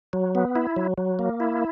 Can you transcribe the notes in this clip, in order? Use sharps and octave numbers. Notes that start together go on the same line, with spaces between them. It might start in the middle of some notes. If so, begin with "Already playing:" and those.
F#3
B3
E4
F#3
F#3
A#3
E4